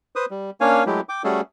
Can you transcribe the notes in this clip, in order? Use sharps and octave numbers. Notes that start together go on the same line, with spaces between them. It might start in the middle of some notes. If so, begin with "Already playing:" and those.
B4 C5 D#6
G3
A#3 C#4 D4 C#5 F5 G#5
F#3 G#3 A3 E4 G4
G5 D6
G3 A3 C#4 F#4 G#4 A4